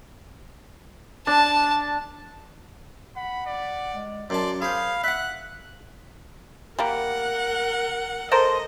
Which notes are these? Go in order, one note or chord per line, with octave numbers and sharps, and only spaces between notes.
D4 A5
F#5 B5
D5
G#3
F#2 D5 A5 C6
G#4 C5 F5 B5
E5 F#5 F#6
G3 A#3 A#4 F#5
A4 A#4 C5 D#5